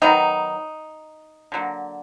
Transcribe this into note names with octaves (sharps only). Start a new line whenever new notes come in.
D#3 F#3 B3 D#4
D3 F#3 A#3